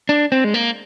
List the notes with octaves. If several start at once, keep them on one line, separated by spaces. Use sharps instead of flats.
D4
C4
G#3
A#3